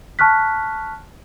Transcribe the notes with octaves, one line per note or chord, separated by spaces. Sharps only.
A5 C#6 F6 F#6 B6